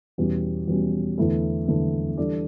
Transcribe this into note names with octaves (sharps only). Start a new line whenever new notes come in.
E2 B2 G3 C#4
E2 B2 G3 C#4
E2 D3 A3 E4 A4
E2 D3 A3 E4 A4
E3 G3 D4 A4 D5